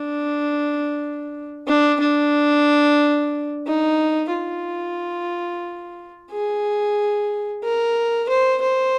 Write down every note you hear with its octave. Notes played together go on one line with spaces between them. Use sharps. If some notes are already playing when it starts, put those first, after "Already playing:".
Already playing: D4
D4
D4
D#4
F4
G#4
A#4
C5
C5